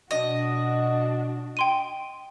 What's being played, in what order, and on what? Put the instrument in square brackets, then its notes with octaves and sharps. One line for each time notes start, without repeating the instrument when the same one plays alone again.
[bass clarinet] B2 [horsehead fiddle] D4 F#4 [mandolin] D#5
[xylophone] G5 C6 D#7